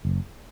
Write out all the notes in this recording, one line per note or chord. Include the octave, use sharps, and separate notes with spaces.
F#1